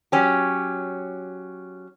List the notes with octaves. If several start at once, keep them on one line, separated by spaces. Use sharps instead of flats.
F#3 C#4 G4